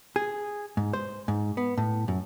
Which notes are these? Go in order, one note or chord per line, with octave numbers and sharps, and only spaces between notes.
G#4
G#2
C5
G#2
B3
A2
F#2